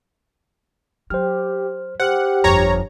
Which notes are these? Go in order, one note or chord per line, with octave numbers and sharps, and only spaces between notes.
F#3 G4 C5 F6
G4 C5 F#5 F6
G1 F2 C#5 A#5